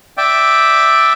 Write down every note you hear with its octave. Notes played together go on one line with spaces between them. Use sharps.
D5 E5 G5